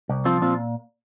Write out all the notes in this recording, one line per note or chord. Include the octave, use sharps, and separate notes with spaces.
C2
F3 C4 F4
A#2 C4 F4